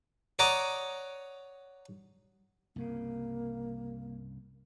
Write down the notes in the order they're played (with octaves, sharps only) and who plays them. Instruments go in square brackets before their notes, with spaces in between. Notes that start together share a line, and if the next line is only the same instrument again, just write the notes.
[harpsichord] C#5 D5 F#5 A#5 D6 D#6
[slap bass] C2 G2 C#3 [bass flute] A#3